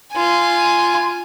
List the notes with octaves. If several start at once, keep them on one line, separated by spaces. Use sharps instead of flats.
F4 G#5